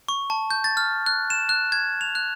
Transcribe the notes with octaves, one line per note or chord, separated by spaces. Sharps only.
C#6
A5
G6
A6
F6
F#6
E7
F#6
G#6
F7
F#6